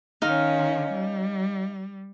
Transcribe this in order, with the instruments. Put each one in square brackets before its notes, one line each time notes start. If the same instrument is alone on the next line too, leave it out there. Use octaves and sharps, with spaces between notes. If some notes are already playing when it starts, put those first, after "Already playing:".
[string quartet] D#3 C#4 [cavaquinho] D#4 F5
[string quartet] G3